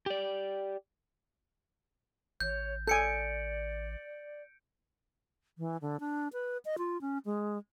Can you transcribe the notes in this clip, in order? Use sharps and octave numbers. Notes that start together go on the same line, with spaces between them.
G4 D5
A1 C#5 G6
A4 D5 G#5 G6 C#7 D7
E3
D3
D4
B4
D#5
F4
C#4
G#3